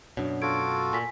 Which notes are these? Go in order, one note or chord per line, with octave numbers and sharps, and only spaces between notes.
F#2 B2 D4 C#5
F4 F#4 A4 G#6 D7
A#2 G#5 B6